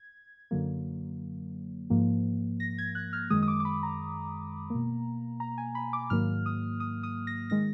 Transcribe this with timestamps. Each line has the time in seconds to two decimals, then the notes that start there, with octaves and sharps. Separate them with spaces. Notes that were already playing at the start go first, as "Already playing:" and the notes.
Already playing: G#6
0.51 F#2 D3 F#3 A#3
1.90 G#2 F3 A#3
2.60 A#6
2.78 G#6
2.95 F#6
3.13 F6
3.30 F#2 D#3 G#3 D#6
3.43 D#6
3.48 D6
3.60 D6
3.65 B5
3.83 A#5
4.70 B2 A#3
5.40 A#5
5.58 G#5
5.75 B5
5.93 D6
6.10 G#2 D#3 F#3 A#3 F6
6.46 D#6
6.80 D#6
7.03 D#6
7.27 A#6
7.50 D#3 G#3 A#6